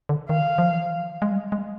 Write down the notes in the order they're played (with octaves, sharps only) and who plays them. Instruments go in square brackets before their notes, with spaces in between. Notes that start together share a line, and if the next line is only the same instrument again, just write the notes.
[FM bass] D3
[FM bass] D#3 [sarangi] F5
[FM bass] F3
E3
G#3
G3
G#3